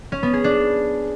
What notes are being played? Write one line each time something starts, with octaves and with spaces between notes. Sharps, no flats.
C#4
B3
G#4
D4